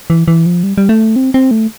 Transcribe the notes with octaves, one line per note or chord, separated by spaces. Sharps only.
E3
E3
F3
G3
G3
A3
C4
C4
A3